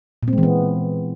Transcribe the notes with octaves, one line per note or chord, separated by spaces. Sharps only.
A#2
C4
G#3
E3
B3